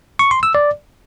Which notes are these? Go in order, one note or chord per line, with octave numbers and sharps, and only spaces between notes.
C#6
C6
E6
D5